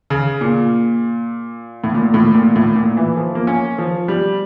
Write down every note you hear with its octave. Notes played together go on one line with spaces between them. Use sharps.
C#3
A#2
A2
A#2
A2
A#2
A2
A#2
E3
F3
A#3
C#4
F3
G3